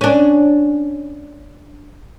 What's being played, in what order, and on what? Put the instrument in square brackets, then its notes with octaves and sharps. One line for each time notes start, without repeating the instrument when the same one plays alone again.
[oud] C#4 D4